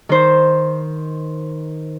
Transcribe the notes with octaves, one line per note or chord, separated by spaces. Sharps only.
D#3 C5